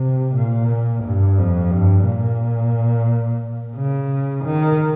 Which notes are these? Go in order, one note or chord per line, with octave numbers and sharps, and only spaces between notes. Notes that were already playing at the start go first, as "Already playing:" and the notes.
Already playing: C3
A#2
G2
F2
G2
A#2
C#3
D#3